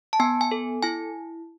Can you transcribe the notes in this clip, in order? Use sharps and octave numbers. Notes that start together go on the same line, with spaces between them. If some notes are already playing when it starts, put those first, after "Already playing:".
A5
B3 G#5
G#5
A4
E4 G#5